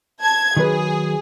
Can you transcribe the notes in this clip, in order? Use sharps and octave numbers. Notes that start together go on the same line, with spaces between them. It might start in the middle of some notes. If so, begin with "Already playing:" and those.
A5 G#6
D#3 F#3 G#4 B4